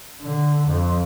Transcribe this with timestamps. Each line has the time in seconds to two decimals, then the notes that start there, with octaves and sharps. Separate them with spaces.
0.22 D3
0.68 F2